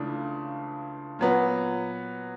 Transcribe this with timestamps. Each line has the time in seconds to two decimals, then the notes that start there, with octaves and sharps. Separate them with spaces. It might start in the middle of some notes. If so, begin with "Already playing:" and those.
Already playing: C#2 C#3 E3 A3 D4
1.19 A#2 F#3 B3